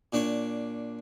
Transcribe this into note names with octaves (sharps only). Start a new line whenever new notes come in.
A#2 D4 C#5